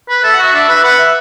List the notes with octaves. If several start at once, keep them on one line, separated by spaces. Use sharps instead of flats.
B4
A4 E5
F#5
F#4 E5
D4
B4
E5
B4 F#5
E5